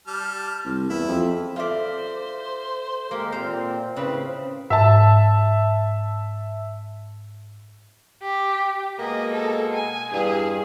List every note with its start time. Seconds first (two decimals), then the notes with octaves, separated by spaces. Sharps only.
0.07 G3 A5 F6
0.65 C2
0.90 E2 E4
1.08 F2
1.56 F4 A4 C5 D5 E5 B6
3.11 G#3 A#3 G4 A#4
3.32 A#2 C4 C5 F5
3.96 A2 C#3 C4 B4
4.70 G#2 E5 A5
8.22 G4
8.99 B2 G#3 A#3 D#5
9.32 A4
9.73 G#5
10.12 E2 G2 G#4